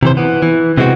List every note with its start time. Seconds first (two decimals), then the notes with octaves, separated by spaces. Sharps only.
0.03 C3 E3 C5
0.17 E3 B3
0.42 E3
0.78 C3 E3 G#3 C4 F#4